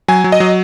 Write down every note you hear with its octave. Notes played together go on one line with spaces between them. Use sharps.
F#3 G#5
F#3
D#5
F#3